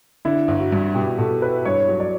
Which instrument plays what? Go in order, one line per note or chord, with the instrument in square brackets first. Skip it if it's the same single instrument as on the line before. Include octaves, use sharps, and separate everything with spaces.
[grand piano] D3 [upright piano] E4
[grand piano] G1
[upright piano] F#4
[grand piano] G2
[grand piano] B2 [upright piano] G4
[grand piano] B2 [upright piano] A4
[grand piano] E4 [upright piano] B4
[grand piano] G2 [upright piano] C#5
[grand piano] F#3
[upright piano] D5